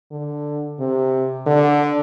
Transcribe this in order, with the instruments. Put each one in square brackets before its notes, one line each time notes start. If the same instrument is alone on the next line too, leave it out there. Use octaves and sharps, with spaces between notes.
[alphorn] D3
C3
D3